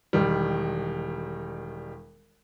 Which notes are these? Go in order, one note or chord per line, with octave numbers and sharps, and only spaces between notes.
E1 D#3 G3